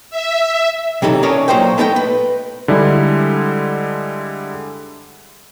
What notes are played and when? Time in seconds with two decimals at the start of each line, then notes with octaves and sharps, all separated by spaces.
0.10 E5
1.02 C3 E3 F#3 D#4 A4
1.23 C#4 D4 A4 A#4 C#5 D#5
1.48 A#2 D#3 F#3 C5 D#5 G5
1.78 A3 B3 A4 D#5 E5 G5
1.96 B4
2.68 D3 G3 G#3 E4